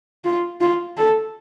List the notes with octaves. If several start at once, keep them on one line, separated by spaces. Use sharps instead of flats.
F4
F4
A4